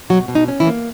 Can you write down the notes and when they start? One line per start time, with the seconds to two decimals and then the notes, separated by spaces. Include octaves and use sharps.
0.09 B2 F#3 F#4
0.28 B2
0.35 D#4
0.48 C#4
0.60 E3 E4
0.67 A#3